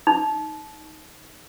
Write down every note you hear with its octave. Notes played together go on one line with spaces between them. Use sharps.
D#4